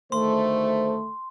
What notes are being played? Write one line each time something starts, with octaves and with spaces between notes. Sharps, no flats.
D2 D#3 A3 C5 C6